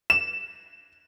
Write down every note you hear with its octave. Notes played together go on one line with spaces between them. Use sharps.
E7